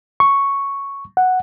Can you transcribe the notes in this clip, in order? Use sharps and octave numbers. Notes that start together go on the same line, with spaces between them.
C#6
F#5